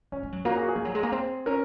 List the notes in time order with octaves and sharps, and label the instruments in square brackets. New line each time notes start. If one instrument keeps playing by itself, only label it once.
[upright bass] F#3 [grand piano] C#4
[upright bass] G#3
F#3
[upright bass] A#3 [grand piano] F#4
[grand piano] G#4
F#4
G#4
[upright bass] F3
F#3
G#3
A#3
C4
[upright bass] C#4 [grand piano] A#4